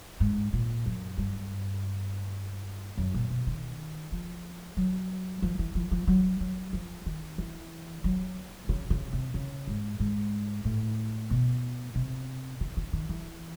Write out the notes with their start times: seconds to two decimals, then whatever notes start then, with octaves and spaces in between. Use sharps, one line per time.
0.20 G#2
0.53 A#2
0.86 F#2
1.18 G2
2.97 F#2
3.14 A#2
3.30 B2
3.47 D#3
4.12 F3
4.77 F#3
5.42 F3
5.59 E3
5.75 F3
5.91 F3
6.07 F#3
6.40 F#3
6.73 F3
7.06 D#3
7.38 E3
8.04 F#3
8.69 C#3
8.90 C#3
9.13 C3
9.34 C#3
9.67 G#2
10.00 G#2
10.65 A2
11.30 B2
11.95 C3
12.61 C#3
12.77 D3
12.93 D#3
13.09 E3